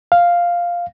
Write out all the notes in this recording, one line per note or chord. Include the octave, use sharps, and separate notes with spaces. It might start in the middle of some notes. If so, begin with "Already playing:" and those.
F5